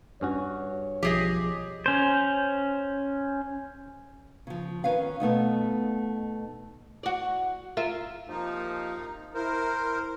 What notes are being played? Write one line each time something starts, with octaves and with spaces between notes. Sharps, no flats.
G2 C#4 F#4 C#5
B1 F3 G4 G#4 D#5
C#4 C5
C#3 F3
D#3 C#4 B4 F5
B2 A3 B3 D#4
F#4 D5
F4 A#4 E5
C3 F3 A#3 D#4
E4 A#4 C5